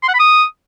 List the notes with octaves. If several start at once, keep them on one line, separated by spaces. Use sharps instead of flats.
C6
F#5
B5
D#6